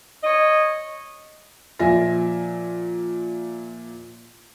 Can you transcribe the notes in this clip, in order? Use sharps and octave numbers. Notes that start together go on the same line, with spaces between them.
C#5 D#5
A#2 F3 E5 G#5 A#6